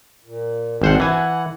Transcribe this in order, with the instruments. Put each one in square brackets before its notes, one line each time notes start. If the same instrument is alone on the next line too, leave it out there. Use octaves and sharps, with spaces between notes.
[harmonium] A#2
[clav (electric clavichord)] G#1 C5 F#5 [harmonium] C4 D4 F#4
[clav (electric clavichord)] E3 G#5 [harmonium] F#5